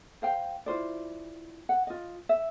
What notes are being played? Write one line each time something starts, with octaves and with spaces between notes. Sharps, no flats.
C5 F5 G5
E4 F4 C5 D5
F#5
F4 D#5
E5